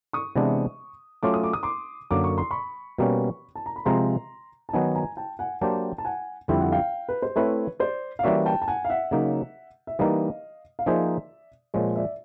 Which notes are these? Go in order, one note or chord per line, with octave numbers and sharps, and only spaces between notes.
C#6 D#6
C3 E3 G#3 B3 D4
F#3 A3 C#4 F4 D6
D#6
D6
D#6
C6 D6
F#2 D3 F#3 A#3 D6
C#6
C6
B5 C#6
B2 G3 A#3 C#4
A5
A#5
B5
C3 F3 G#3 C4 A#5 C6
A5
D#3 F#3 B3 D#4 G#5 A#5
G#5 A#5
G5 A5
F#5 G#5
F#3 A#3 D4 G4 C5 G5 A5
A5
F#5 G#5
F2 D3 G3 C4 E4 G5
F#5
F5 G5
B4
C5
A3 C4 E4 B4 C#5
C5 D5
F5
E3 G3 A#3 C#4 F#4 D5 E5
G5 A5
A5
F#5 G#5
F5
E5 F#5
C#3 F#3 A#3 D#4
E5
E3 G3 A#3 D#4 D#5 F5
F5
F3 A#3 D#4 G#4 C5 D5 E5
A#2 F3 G#3 C#5 D#5
D5 E5